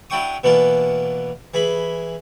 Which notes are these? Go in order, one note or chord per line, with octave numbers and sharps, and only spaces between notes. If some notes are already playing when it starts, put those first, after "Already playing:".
F#3 D4 E4 G5 C#6 D#6
B2 E3 A#3 B3 D4 F4
E3 G#4 B5